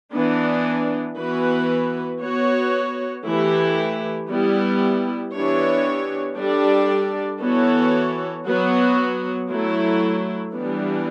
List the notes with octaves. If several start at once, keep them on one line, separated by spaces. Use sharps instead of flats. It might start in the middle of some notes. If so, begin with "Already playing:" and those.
E3 B3 D4
E3 B3 F#4 B4
B3 F#4 C#5
E3 A3 E4 G4
G3 B3 E4
E3 B3 D4 G4 C#5
G3 D4 A4 D5
E3 B3 F#4 A4 C#5
F#3 B3 F#4
F#3 A3 E4
E3 G3 B3 D4